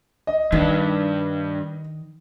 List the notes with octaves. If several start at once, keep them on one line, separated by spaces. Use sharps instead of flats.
D#5
G2 D#3 D4